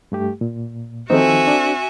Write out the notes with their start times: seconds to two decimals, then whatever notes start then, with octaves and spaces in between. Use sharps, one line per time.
0.12 G2 A3 G4
0.41 A#2
1.10 D#3 F3 C4 D#4 F#4 A4 E5 G#5
1.47 D4